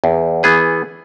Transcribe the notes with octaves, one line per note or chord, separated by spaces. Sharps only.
E2
E3 B3 G#4 B4